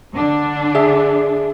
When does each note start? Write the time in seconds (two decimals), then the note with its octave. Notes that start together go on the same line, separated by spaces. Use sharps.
0.14 D3 D4
0.75 G#4 E5